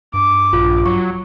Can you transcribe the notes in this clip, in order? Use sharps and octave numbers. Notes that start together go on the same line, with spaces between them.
G2 D6
A#1 F4
F#3 C#6